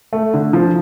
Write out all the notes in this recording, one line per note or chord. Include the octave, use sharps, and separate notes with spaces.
A3
D3
F3